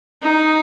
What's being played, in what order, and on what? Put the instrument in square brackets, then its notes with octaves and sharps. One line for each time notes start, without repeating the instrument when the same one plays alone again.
[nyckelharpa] D#4